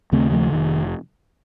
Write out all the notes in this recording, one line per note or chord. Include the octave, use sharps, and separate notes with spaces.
D#2 C#3 A3 C4
F3 A3
F1 D#3